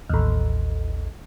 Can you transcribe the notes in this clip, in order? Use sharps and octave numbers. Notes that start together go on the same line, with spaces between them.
A1 D#2